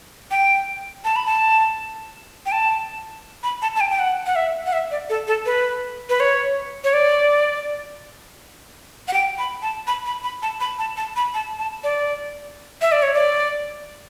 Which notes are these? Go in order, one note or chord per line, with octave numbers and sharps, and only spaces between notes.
G5
A5
B5
A5
G5
A5
B5
A5
A5
G5
G5
F#5
F#5
E5
F#5
E5
D5
A4
A4
B4
B4
C#5
C#5
D5
F#5
G5
B5
A5
B5
B5
B5
A5
B5
A5
A5
B5
A5
A5
D5
E5
D5
C#5
D5